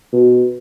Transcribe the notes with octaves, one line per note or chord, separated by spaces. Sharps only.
B2